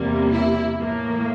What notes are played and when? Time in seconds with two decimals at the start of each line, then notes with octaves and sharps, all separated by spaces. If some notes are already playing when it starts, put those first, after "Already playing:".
Already playing: E2 C3 G3 A#3
0.32 E4
0.79 A2 E3 A#3